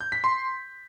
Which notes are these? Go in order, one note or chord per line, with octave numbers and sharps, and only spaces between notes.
G6
B6
C6